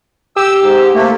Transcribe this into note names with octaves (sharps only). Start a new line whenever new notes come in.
G4 E6
G#2
C3 A3 A#3